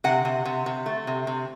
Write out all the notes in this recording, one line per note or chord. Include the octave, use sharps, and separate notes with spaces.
C3 F#5
C3
C3
C3
A3
C3
C3